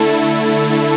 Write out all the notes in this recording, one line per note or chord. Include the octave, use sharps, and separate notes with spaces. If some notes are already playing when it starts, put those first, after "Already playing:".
Already playing: D3 A3 E4 A4